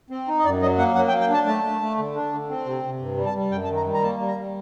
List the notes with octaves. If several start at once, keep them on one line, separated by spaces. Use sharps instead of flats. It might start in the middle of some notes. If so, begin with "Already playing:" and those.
C4
D#4
D#5
F#2 D5
F#3 D#5
A#3 F#5
F#3 F#5
G5
A#3
G5
D4 A5
A3 A5
A3
A3
D3
D4
D3
C4
C3
C3
G2
G3
A5
G3
F#2 G5
A5
D#3
A#5
G3
A#5
A#3 A5
G3
A#5
G3